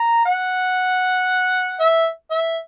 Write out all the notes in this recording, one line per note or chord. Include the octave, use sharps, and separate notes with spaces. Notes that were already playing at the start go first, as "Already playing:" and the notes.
Already playing: A#5
F#5
E5
E5